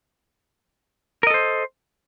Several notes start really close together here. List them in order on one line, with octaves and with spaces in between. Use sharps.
A#4 D#5 A4 C5